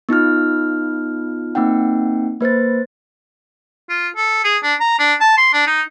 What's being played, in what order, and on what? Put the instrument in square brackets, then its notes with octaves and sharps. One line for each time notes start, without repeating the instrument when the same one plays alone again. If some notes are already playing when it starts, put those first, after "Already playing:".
[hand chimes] B3 D#4 F4 F6
A#3 C4 D#4 F#5 G5
A#3 B4 C5 A6
[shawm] F4
A4
G#4
D4
A#5
D4
A5
C6
D4
D#4